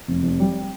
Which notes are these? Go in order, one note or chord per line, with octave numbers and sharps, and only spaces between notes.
F1
F1
G3